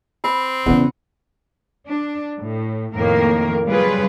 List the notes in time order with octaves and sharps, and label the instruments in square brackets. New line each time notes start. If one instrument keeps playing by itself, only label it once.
[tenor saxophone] C4 [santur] B5
[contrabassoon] E2 [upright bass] C#3 C#4 [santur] F#5 D#6
[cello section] D4
A2
F2 A2 D#3 A#3 A#4
C#3 F#3 G3 F4 G#4 B4